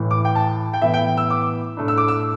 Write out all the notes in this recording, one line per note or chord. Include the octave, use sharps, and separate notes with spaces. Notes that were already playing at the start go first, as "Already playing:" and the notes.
Already playing: A1 A2 E3
D6
G5
A5
G5
A2 E3 B3 E4 E5
G5
E6
D6
A2 A3 D4
E6
D6
E6